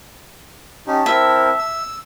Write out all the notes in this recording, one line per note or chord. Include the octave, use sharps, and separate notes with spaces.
C#4 D#4 G4 A5
C4 E4 A#4 E5
E6